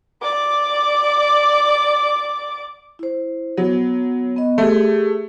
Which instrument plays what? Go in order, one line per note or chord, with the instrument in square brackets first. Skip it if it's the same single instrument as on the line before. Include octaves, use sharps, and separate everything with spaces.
[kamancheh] D5 D6
[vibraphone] E4 C5
[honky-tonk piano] F#3 [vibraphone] B3
[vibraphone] B3 D#5
[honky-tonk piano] A3 [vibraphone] G4 G#4